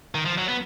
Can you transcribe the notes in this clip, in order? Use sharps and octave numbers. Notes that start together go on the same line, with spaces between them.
D#3
F3
F#3
B3